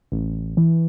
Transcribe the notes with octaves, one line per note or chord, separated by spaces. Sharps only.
A1
E3